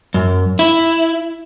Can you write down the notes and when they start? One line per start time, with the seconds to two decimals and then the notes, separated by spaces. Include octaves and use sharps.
0.14 F#2
0.59 E4